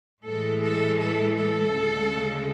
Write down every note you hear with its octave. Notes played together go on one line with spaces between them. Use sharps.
A2 E3 G#3 A4
A4
A4
A4
D2 C#3 G#3